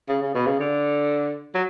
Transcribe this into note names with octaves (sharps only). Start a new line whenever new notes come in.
C#3
C#3
B2
C#3
D3
F#3